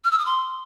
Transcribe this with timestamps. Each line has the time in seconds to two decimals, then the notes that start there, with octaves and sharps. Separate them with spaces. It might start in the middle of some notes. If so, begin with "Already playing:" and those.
0.04 F6
0.11 E6
0.19 D#6
0.26 C6